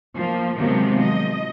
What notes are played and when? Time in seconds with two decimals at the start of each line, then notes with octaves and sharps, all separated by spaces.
0.17 F3 A#3
0.57 C3 D#3 F3 F#3 G#3 B3
1.01 D#5